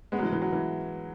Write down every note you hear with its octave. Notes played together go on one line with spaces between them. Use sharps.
G#3 B3
F#3
E3 G#3
E3
F#3
E3